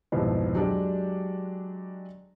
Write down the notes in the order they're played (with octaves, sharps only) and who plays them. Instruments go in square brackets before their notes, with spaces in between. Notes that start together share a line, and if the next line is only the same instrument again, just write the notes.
[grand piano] C2 F2 G#2 B2
F#3 G#3 D4 G4 D5